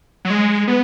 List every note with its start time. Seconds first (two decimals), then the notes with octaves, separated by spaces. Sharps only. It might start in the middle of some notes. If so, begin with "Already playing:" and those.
0.25 F#3
0.30 G#3
0.68 B3